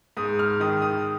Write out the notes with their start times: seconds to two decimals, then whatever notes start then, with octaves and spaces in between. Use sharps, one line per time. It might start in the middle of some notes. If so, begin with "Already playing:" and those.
0.17 G#2 D#6
0.39 F6
0.60 D#3 D#6
0.82 D#6